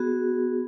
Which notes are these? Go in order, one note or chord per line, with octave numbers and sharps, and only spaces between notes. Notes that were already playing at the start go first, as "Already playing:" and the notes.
Already playing: B3 F#4 G#4